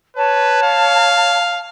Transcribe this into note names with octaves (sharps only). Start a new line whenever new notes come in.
B4 C#5 A5
F5